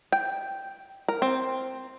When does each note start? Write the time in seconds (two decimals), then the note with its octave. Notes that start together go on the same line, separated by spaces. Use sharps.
0.12 G5
1.08 A#4
1.22 C4